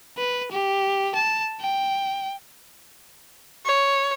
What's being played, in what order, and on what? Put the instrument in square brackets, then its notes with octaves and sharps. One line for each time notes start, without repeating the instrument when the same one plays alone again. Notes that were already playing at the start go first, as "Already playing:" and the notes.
[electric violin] B4
G4
A5
G5
[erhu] C#5